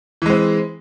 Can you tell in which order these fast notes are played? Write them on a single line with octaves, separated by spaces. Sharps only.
E3 G#3 C4